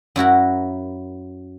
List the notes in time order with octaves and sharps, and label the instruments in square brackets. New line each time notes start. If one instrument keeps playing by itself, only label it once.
[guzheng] F#2 E4 F#4 A#4